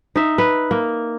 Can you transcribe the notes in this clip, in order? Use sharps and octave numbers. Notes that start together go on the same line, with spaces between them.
D#4 E5
B4
A#3